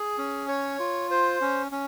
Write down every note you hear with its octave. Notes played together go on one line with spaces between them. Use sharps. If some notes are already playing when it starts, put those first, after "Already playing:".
Already playing: G#4
C#4
C#5
F4
C5
C#4
C#4